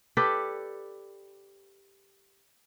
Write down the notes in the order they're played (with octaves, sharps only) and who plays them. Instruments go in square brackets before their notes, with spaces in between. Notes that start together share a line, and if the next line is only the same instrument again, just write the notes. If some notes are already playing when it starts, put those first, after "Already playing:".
[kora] G4 A4 B4 D5